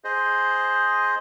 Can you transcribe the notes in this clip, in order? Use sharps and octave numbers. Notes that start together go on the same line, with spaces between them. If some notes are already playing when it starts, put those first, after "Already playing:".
G#4 C5 D#5